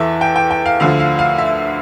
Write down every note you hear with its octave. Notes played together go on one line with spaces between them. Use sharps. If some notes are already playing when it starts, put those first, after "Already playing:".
Already playing: E2 E3 A4 E5
G5
G5
G5
F5
D2 D3 F3 F5
F5
F5
E5